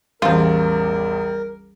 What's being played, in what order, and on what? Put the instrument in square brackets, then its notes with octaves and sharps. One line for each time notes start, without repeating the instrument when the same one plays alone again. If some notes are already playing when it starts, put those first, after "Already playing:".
[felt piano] A1 E2 [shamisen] F3 F4 [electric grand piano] G3 [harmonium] A#4